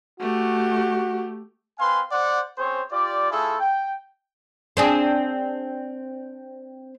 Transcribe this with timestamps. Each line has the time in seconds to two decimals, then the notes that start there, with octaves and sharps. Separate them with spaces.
0.20 A3 F#4 G4
1.79 C4 B4 F5 G#5 C6
2.11 C5 D5 F#5
2.58 C4 C#4 G#4 C5 C#5
2.90 F4 G4 D5
3.30 A3 E4 F4 G#4 A4
3.59 G5
4.77 C4 D4 G#4